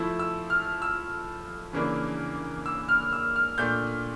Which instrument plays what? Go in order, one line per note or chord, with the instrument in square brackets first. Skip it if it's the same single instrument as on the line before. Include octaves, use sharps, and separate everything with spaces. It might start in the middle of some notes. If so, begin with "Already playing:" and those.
Already playing: [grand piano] F3 A3 E4 E6
E6
F6
E6
C#3 E3 A#3 D4
E6
F6
E6
F6
A#2 A3 D4 G6